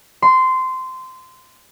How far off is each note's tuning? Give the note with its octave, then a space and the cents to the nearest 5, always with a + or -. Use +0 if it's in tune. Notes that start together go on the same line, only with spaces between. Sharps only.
C6 -15